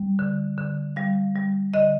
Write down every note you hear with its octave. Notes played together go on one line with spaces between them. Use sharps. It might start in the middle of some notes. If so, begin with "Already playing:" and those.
Already playing: G3
D3
D3
G3 F5
G3
D3 D#5